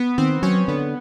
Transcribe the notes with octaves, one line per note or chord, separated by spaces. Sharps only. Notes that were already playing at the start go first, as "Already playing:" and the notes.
Already playing: B3
D#3 C4
F#3 C#4
D3 B3